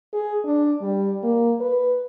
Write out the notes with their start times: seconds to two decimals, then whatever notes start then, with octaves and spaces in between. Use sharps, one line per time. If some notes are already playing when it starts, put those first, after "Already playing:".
0.14 G#4
0.45 D4
0.81 G3
1.23 A#3
1.60 B4